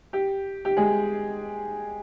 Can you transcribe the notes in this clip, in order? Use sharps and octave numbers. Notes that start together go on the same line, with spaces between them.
G4
G4
G#3 G#4